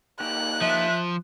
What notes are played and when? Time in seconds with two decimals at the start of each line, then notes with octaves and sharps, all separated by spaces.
0.20 A#3 D#4 G4 F#6
0.61 F3 E5